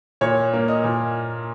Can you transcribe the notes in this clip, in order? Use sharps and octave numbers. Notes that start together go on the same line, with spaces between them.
A#2 C#5
A#3
D#5
A#2